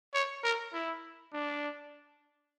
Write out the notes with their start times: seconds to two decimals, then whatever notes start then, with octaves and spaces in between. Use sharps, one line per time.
0.14 C#5
0.44 A#4
0.73 E4
1.33 D4